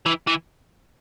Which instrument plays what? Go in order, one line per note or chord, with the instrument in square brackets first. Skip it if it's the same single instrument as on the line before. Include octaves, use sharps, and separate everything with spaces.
[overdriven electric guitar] E3
E3